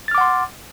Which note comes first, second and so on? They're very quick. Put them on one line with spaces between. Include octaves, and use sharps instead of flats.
A6 F6 D6 F#5 C6